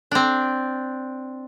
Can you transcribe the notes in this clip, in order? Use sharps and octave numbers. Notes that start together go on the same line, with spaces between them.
C4 D4